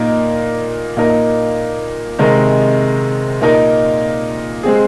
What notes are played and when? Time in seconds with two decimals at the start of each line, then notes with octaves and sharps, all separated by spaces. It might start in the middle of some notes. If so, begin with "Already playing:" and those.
Already playing: A#2 A#3 D#4 A#4
0.97 A#2 A#3 D#4 A#4
2.19 C3 D#3 G#3 D#4 A#4
3.41 A#2 A#3 D#4 A#4
4.63 G#3 C4 G#4